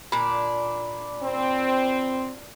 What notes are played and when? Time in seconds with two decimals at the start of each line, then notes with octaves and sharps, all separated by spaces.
0.12 A#2 D4 B5
1.23 C4